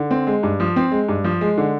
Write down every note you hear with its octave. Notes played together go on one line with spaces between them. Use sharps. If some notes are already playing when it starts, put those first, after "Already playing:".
Already playing: D3
C4
G#3
G2
F3
C4
G#3
G2
F3
G#3
D3